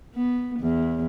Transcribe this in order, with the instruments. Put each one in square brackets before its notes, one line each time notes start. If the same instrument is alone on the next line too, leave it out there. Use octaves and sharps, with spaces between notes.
[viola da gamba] B3
E2